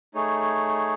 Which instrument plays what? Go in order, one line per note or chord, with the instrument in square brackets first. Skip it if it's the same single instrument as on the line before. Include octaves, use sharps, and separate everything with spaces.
[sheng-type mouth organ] A3 D#4 G#4 C#5